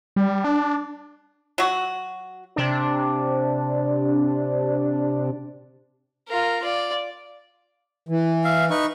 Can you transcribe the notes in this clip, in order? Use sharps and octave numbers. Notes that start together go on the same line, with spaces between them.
G3
D4
F#3 F#4
C3 D4
F4 A#4
F4 D5
E3
E5 F5
D#4 B4 C#6